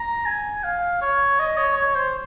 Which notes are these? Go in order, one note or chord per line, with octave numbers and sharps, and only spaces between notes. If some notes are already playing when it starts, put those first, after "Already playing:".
Already playing: A#5
G#5
F5
C#5
D#5
C#5
C#5
C5